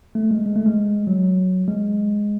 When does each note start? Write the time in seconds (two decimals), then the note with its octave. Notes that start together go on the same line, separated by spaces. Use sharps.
0.15 A3
0.31 G#3
0.46 G#3
0.56 A3
0.66 G#3
1.07 F#3
1.68 G#3